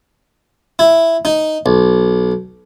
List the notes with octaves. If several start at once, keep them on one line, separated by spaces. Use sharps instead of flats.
E4
D#4
B1